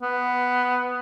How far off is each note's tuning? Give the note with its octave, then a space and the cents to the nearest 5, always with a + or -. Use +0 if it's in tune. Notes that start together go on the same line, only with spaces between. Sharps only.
B3 +5